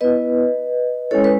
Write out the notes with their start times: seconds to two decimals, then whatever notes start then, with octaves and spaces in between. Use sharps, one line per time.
0.01 B3 E4 B4 D#5
1.11 G#3 C#4 E4 A4 C#5
1.24 B4